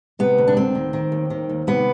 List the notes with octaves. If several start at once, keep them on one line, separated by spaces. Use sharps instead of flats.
C3 B3
D2
D4
D2 C4
D#3
D#3
D#2
D#3
D#2
C3 B3